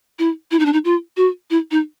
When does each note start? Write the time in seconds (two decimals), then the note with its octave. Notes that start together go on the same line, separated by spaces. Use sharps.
0.19 E4
0.51 E4
0.59 D#4
0.65 D4
0.73 D#4
0.85 F4
1.17 F#4
1.50 E4
1.71 D#4